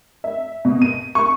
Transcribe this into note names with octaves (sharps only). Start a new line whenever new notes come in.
E5
B2
D#7
C#6